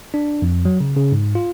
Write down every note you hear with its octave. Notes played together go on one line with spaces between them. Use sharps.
D4
F2
F#3
C#3
C#3
G#2
F4